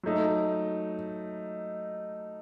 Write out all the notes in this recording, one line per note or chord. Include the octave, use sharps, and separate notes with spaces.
F#3 A3 D#4